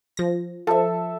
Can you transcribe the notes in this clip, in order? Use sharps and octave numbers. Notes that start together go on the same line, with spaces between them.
F3 A#6
F3 A4 E5